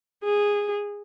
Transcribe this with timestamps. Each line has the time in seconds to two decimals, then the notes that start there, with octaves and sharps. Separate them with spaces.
0.24 G#4